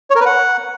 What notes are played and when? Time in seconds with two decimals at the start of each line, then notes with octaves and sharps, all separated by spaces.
0.10 C#5
0.15 A#4
0.20 B4
0.25 F#5